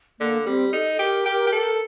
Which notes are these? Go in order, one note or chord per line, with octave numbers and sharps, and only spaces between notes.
D3 A#3
G3 C4
D#4 A4
G4 A#4
G4
G4
A4